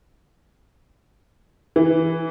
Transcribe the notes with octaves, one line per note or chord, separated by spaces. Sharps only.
E3